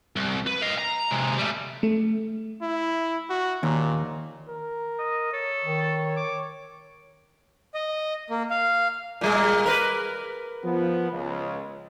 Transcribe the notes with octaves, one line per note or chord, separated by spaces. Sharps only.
C2
B4
D#5 F5
A#5
C3 G#3
G3 A3
A3
E4
F#4
D#2 A#2
A#4
D#5
A4 C#5
D#3
D6
D#5
A#3
F5
A#2 G3 G#3
A#4 B4
F3 B3
C#2